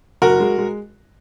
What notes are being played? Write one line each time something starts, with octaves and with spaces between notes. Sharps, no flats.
F#1 F#4 A#4
G#3
G#3